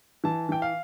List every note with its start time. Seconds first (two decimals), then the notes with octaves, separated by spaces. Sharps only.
0.24 E3 A5
0.49 E3 G5
0.62 F5